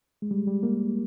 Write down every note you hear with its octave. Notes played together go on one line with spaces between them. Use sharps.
G#3
G3
G3
A#3